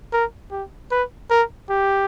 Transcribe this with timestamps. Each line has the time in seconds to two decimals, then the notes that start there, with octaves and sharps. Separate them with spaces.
0.13 A#4
0.51 G4
0.91 B4
1.31 A#4
1.70 G4